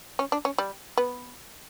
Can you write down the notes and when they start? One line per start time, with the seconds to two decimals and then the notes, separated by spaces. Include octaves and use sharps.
0.19 C#4
0.32 D4
0.45 C#4
0.58 G3
0.97 B3